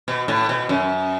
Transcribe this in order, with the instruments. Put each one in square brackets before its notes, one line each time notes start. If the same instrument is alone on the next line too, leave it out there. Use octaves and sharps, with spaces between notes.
[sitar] B2
A2
B2
F#2